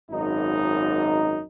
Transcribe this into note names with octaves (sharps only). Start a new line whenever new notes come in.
G#1 F#2 D#4